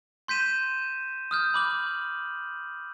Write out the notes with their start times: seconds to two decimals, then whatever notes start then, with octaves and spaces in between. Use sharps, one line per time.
0.28 C6 G6 B6 D#7 E7
1.31 D#6 F6 G6
1.54 B5 D6 F#7